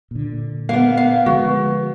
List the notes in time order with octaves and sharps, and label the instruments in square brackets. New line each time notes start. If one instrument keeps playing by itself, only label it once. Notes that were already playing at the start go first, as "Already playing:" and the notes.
[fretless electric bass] A#2 D3
[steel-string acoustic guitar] A#3 B3 [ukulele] F5
[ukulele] F5
[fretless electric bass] D3 F3 G#3 [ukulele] F#4